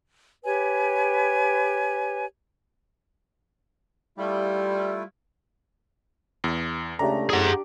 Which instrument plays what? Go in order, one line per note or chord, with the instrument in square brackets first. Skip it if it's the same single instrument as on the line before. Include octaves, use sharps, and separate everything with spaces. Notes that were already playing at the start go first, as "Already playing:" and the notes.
[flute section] G4 B4 C#5 G#5
[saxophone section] G3 [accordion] A3 E4 F4
[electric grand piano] E2
[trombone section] C#2 C#3 A3 [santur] D4 G4 [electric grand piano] A#5
[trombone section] A1 A2 [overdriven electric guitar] G#4 F#5 [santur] D6